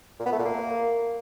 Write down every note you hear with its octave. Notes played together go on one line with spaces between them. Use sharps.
A#2
B3
A3
A#2
A#3